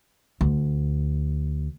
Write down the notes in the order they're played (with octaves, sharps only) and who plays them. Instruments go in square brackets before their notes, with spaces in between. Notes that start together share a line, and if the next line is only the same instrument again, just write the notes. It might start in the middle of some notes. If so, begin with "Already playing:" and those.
[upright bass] D2